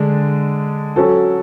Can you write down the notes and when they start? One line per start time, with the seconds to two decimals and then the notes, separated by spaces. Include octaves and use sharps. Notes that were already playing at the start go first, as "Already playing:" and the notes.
Already playing: D3 G#3 D4
0.96 F#3 C#4 F#4 A4